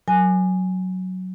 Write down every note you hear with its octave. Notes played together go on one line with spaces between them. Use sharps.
F#3 G#5